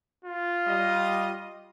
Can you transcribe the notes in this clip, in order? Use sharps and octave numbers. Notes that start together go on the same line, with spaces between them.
F4
G3 D#5